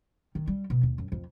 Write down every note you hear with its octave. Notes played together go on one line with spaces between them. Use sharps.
D#3
G3
B2
D#2
F#2
F2